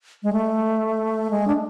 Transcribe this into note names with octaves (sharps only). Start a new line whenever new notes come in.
G#3
A3
G#3
D4